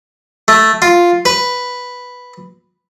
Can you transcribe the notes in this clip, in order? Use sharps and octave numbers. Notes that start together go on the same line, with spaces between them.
A3
F4
B4